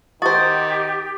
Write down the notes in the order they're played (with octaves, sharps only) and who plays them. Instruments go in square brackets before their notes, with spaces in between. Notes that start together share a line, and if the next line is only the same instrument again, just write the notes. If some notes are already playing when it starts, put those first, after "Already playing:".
[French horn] D#3 [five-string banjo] F#4 C5 [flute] G4 [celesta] D#6 A6